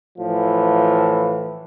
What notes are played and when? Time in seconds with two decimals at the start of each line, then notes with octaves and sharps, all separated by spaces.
0.19 A2 E3 F3